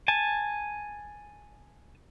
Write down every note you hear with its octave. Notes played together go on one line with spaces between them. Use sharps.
G#5 A5